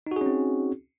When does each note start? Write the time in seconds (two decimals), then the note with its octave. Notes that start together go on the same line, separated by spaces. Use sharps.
0.07 D#4
0.11 F#4
0.16 G#4
0.21 C#4
0.26 C4